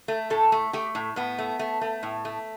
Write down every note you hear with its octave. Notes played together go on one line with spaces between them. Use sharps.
A3
A2 A4
A3
A3 G4
A2
A2 B3
A3
A3
A3
A2
A3